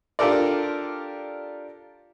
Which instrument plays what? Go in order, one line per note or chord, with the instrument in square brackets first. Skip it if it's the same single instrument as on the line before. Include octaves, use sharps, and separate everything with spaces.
[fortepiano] D4 F4 G4 A4 A#4 D5